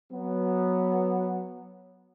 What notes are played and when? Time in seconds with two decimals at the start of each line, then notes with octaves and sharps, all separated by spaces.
0.12 F#3 B3